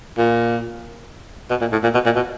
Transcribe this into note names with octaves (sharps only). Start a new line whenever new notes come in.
A#2
B2
A#2
A2
A#2
B2
A#2
B2